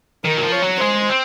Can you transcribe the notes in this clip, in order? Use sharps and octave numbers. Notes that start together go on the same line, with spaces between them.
D#3 A#4
F#3
F3
C#5
F#3
G#3 C5
C4